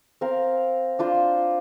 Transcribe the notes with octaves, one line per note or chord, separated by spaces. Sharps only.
C4 A#4 F5
D4 F4 C5